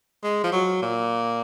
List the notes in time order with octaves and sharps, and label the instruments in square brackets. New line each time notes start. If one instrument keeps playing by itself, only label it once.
[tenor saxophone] G#3
F3
F#3
A#2